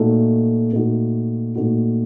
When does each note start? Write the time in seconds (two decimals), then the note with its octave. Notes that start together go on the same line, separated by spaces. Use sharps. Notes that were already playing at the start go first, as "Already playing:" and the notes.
Already playing: A#2 A3 D#4 F#4
0.72 A#2 A3 D#4 F#4
1.56 A#2 A3 D#4 F#4